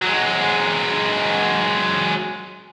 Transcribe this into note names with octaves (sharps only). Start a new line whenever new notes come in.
F#3 G#3